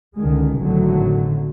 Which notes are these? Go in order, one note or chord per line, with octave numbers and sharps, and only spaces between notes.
C#2 D3 D#3 G#3
G#1 A2 D3 F#3